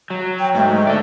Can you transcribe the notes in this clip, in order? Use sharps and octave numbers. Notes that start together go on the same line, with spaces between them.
F#3
G5
G#2 A3
A4 D5